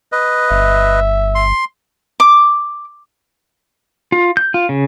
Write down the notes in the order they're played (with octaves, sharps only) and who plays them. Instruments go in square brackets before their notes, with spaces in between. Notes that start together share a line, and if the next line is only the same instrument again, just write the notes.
[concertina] B4 D#5
[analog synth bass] G1 [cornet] E5
[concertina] C6
[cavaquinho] D6
[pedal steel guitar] F4
G6
F4
C#3